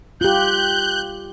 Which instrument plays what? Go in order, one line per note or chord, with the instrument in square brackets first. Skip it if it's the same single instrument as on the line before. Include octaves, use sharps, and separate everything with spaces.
[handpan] F4 G4 [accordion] F#6 G6